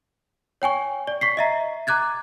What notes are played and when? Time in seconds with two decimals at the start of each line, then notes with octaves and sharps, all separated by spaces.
0.62 C#5 G5 G#5 C#6
1.07 D5
1.21 C#6 B6 C7
1.37 D#5 E5 A#5
1.87 A#5 D6 F#6 G#6 A6